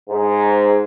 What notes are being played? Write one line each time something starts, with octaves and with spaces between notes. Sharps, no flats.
G#2